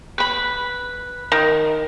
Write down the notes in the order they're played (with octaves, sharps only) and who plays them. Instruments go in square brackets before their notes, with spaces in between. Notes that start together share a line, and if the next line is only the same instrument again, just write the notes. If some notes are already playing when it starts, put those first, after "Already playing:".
[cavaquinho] B4 B5
[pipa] D#3